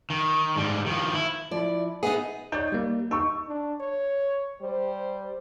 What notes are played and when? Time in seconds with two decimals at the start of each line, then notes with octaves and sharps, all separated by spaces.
0.10 D#3
0.56 G#2 G3
0.86 D#3 F3
1.14 E4
1.51 F3 E4 D5
2.03 B3 D#4 G#4 E5 F#5
2.52 D#4 C#5 D5 G6
2.72 G3 A#3
3.11 D#4 C#6 E6
3.47 D4
3.80 C#5
4.61 G3 C5